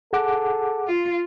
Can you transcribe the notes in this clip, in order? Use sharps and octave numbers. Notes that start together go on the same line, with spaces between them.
G#4 A4 F#5 D6
F4